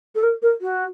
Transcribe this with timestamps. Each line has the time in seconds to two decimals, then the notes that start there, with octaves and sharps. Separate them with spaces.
0.15 A4
0.23 A#4
0.42 A#4
0.61 F#4